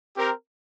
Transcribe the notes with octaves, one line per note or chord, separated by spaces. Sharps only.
C4 G4 A#4